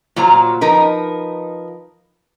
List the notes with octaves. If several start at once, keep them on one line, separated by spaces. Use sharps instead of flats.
A#2 F#3 F4 C5 A#5
F3 D#4 A#4 B4